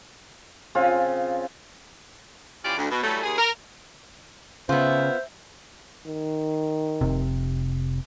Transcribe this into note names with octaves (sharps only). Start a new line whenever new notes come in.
C#3 C4 F4
E3 C#4 F4 G4 D5
D2
B2
E3 F#3 G3 A3
D#2 G#4
A#4
C#3 B3 F4 C5 E5
D#3
F1 C3